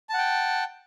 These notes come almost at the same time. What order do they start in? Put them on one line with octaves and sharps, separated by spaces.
A5 F#5 G5